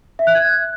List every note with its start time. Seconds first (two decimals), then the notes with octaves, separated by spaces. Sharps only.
0.19 E5
0.27 F#6
0.35 G#6